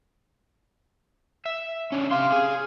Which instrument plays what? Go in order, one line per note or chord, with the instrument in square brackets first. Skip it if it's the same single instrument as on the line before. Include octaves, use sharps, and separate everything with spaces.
[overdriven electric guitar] E5
D3 C#4
[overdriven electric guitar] G4 C6 [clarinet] F5
[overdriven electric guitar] G#4